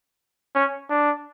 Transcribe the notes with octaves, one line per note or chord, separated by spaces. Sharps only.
C#4
D4